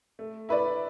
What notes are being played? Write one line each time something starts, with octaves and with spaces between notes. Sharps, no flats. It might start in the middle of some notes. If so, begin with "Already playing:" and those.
A3
E4 B4 D5